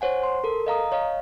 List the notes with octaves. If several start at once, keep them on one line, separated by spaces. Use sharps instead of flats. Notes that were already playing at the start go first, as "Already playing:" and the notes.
C5 C#5 F#5 G#5
C6
A4 A#4
D#5 F5 A#5 D#6
C#5 D#5 F5